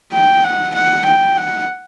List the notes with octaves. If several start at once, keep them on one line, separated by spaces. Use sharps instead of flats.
G5
F#5
F#5
G5
F#5